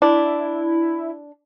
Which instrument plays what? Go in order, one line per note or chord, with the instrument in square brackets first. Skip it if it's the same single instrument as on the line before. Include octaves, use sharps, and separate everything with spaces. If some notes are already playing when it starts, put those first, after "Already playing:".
[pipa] D4 [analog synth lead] E4